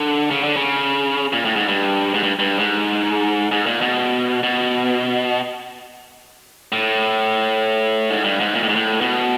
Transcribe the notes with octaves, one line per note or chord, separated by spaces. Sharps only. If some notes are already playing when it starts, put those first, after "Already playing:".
Already playing: D3
C#3
D3
C#3
A#2
A2
G#2
G2
G#2
G2
G2
G#2
G#2
A#2
B2
B2
A2
G#2
G2
G#2
A#2
A2
G#2
A2
B2